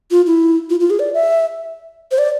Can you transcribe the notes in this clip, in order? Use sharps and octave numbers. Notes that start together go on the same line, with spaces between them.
F4
E4
F4
F4
G#4
D5
E5
C5
D5